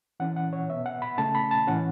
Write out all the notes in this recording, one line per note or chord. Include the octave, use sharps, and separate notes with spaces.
E3 C#4 F#5
F#5
C#5
B2 B3 E5
F#5
B5
C#3 A3 C#4 A5
B5
A5
A2 E3 C#4 F#5